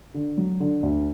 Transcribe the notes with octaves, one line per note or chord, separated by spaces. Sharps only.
D3
F#3
D3
D2